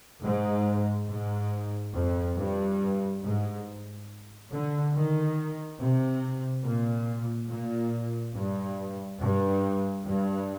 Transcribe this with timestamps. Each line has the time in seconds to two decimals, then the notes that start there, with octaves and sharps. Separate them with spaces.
0.23 G#2
1.09 G#2
1.94 F2
2.37 G2
3.23 G#2
4.50 D3
4.93 D#3
5.79 C3
6.64 A#2
7.49 A#2
8.34 G2
9.20 G2
10.05 G2